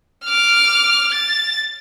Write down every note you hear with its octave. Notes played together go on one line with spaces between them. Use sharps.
D6 F6
A6